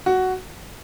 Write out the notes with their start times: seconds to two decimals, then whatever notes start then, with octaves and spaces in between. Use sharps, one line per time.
0.06 F#4